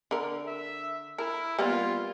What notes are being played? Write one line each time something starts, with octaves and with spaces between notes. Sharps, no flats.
D3 A#4
E5
E4 A#4
G3 A#3 B3 F4